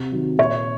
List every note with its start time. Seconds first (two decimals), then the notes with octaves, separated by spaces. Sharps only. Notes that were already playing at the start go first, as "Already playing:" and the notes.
Already playing: C3
0.12 D#3 F#3
0.38 A#2 C#5